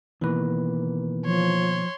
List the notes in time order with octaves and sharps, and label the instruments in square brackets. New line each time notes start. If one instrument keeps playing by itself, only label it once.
[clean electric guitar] B2 D#3 A#3 [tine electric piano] E3 B4
[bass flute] F3 [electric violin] C#5 C6